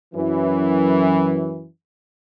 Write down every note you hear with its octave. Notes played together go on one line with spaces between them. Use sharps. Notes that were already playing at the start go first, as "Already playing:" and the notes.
F#2 E3